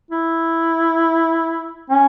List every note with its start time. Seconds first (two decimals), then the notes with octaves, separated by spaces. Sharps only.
0.11 E4
1.90 C#4